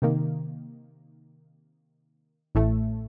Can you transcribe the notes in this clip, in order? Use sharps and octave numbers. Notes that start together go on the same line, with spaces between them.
C3 D#3 A#3
A1 A2 A3